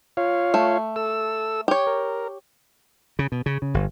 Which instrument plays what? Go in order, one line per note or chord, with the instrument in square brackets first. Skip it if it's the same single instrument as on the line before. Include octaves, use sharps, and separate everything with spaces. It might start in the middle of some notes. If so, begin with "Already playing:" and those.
[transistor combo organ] F4 C#5 F5
[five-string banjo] A3
[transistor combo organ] A4 E6
[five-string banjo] G4 C#5
[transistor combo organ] A#4
[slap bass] C#3
B2
C#3
C#3
G1